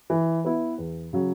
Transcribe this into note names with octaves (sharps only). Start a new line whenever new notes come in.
E3
B3 E4
E2
C#3 F#3